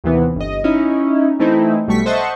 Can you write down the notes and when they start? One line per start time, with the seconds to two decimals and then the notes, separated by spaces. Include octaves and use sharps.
0.04 D#2 C3 E3 B3
0.36 G1 D#5
0.64 C#4 D#4 E4
1.39 E3 A3 C4 D#4 E4
1.88 B1 G3 A3 C#6 B6
2.06 C5 D#5 E5 F#5 A5 C#6